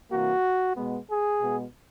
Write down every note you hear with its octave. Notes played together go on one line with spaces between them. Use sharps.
C3 E3 G3 A#3 F#4
B2 G#3 B3
G#4
B2 G#3 B3